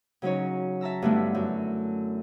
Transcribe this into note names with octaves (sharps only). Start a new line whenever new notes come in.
C#3 F#3 C#4 D#4 C#5
E5 A5 A#5 E6
G2 D3 A3 B3 D4 E4
F#2